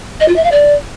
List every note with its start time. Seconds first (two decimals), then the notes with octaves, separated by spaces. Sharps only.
0.20 D#5
0.28 F4
0.36 E5
0.43 F5
0.51 D5